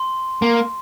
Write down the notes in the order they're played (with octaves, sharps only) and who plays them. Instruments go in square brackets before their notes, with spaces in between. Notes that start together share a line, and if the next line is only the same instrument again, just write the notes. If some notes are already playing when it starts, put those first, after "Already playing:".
Already playing: [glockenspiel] C6
[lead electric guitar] A#3